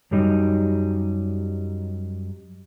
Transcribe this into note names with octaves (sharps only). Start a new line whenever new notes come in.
F#2 F#3 G3 D#4